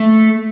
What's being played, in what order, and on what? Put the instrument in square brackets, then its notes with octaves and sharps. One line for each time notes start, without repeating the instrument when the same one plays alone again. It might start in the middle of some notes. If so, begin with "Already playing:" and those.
Already playing: [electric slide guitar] A3